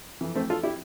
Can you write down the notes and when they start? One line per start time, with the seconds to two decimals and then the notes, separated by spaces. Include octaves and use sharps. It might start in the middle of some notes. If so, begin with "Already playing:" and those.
0.21 F2 E3
0.35 A3 C4
0.50 F4 A4
0.63 E4 G4